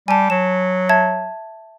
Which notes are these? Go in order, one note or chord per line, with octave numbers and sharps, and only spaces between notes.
G3 G#5 A5
F#3 E7
E5 A5 G#6